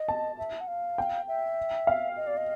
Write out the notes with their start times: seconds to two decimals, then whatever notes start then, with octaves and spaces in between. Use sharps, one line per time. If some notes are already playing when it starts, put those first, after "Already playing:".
Already playing: D#5
0.08 A5
0.38 E5
0.61 F#5
0.68 F5
0.98 G5
1.28 E5
1.87 F5
2.17 D#5
2.27 D5
2.37 D#5